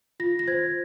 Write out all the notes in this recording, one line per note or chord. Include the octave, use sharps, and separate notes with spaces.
F4 A#6
A#6
C5 G#6